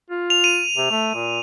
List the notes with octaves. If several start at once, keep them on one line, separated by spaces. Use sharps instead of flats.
F4
F7
D#7
C3
A3
A#2